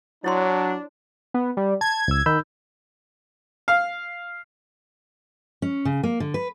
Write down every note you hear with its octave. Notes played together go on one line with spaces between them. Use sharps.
F#3 D4 E4 C#5 C6
B3
G3
A5 G#6
C#2 E6
D#3 B5 E6 G6
F5
C#4
C#3
A#3
D3
B4